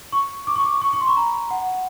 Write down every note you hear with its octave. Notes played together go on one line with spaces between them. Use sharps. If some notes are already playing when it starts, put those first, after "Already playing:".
C#6
D6
C#6
D6
C#6
C#6
C6
B5
A#5
F#5